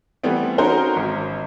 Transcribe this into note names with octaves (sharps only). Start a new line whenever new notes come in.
E3 G3 A3 B3 C4
C#4 D#4 F#4 A#4 C5
G#1